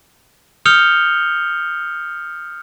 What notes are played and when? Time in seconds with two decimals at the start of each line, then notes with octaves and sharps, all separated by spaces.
0.65 D#6 F6 G6 C#7 F7 G7